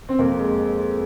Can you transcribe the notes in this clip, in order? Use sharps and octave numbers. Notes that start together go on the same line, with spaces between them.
C4
F2 A#3
G#3